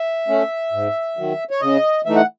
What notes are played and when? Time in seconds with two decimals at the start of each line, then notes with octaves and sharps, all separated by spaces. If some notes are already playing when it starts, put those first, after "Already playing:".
Already playing: E5
0.28 A3 C#4
0.72 G#2
1.17 D#3 F#3
1.51 C#5
1.61 C#3 D#5
2.05 E3 A3 D#4 E5
2.16 F#5